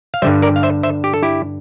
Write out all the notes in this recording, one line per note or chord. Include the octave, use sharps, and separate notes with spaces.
F5
G2 D3 G3 C5 E5
A#4 D5
F5
C5 E5
C5 E5
G4
A4
E4 G4